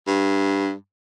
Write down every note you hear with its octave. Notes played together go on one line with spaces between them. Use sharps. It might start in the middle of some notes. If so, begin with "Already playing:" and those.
G2